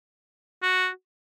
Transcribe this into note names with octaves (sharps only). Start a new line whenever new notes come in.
F#4